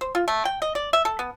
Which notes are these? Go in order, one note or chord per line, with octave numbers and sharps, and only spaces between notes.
C5
F4
A3
G5
D#5
D5
E5
A4
B3